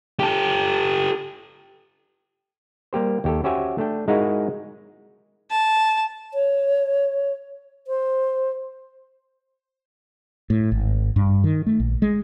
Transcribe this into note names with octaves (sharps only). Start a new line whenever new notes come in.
G4 A4
G3 A#3 G4 C5
D#2 G4 A4
C#4 F#4 G4 C5 E5 G#5
A3 D4 G5
G#3 D#4 E4 F#4 A#4 F5
A5
C#5
C5
A2
G#1
G2
D#3
A3
A#1
G#3